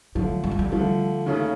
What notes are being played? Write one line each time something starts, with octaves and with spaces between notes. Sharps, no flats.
D3 F3 F#3 A3
G3
G#3
G3
D3 F3 G3 A3
D#2 C#3 F#3 A3 C#4